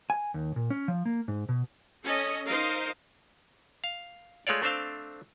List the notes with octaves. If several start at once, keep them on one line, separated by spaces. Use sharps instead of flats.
G#5
D#2
A#2
C#4
F3
A#3
G#2
B2
C#4 A4 D#5
D#4 A#4 C5 D#5 F5
F5
G#3 A3 F4 C#5 D5
A3 C4 D4 C5 F5